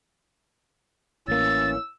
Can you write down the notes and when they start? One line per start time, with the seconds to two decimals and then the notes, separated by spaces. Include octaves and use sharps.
1.28 A1 E3 A#3 C#4 E6 A6